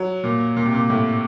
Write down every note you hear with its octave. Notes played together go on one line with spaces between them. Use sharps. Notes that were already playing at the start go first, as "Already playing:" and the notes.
Already playing: F#3
A#2
A#2
C3
A#2
A2